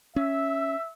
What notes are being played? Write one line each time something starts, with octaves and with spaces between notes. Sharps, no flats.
C#4 E5 E6